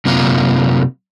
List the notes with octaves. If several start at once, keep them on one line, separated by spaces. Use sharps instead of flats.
F#2 C3 A#3 F4